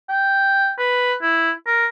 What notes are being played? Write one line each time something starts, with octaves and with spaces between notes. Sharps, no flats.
G5
B4
E4
A#4